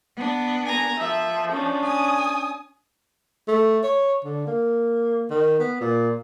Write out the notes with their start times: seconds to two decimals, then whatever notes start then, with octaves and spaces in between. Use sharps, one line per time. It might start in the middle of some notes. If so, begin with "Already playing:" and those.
0.16 B3 D4
0.66 G#5 A#5
0.99 F3 E5
1.51 C#4 D4
1.84 G#5 D#6
3.48 A3
3.84 C#5
4.25 D3
4.47 A#3
5.30 D#3
5.60 B3
5.81 A#2